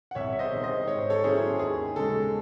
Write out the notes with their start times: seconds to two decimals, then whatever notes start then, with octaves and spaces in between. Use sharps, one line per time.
0.11 F#5
0.15 C2 C#5 E5
0.33 E5
0.39 C5 D#5
0.52 C3 D#3
0.63 C5 D#5
0.87 G#2 C#5
0.98 C5
1.10 A4 C#5
1.24 D#3 F#3 C#4 E4 G#4 C5
1.59 D#2 G#4
1.96 C#3 G#3 A4